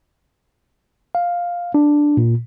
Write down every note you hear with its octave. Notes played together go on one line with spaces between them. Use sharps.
F5
D4
A#2